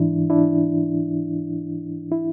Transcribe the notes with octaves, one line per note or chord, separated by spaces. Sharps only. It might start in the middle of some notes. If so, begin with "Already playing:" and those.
Already playing: G#2 E3 D4 E4
D4 E4
E4